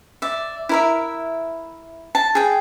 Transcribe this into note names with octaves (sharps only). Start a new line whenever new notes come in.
D5 E5
E4 A#4 E5
A5
G#4 G5